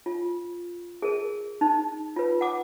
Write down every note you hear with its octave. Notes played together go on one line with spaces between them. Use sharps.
F4
G#4 A#4
D#4
F4 B4
F#5 D6